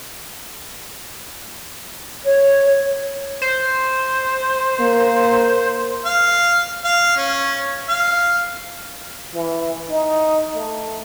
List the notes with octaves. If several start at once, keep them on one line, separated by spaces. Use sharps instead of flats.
C#5
C5
A#3
F5
F5
C#4
F5
E3
D#4
A3